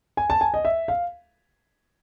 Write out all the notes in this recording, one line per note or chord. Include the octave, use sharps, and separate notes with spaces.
G#5
A5
G#5
D#5
E5
F5